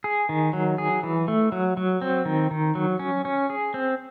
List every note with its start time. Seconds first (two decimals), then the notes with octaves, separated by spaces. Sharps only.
0.04 G#4
0.29 D#3
0.53 F#3
0.78 G#4
1.03 E3
1.28 A3
1.52 F#3
1.77 F#3
2.01 C4
2.25 D#3
2.51 D#3
2.75 F#3
2.99 C#4
3.25 C#4
3.50 G#4
3.74 C4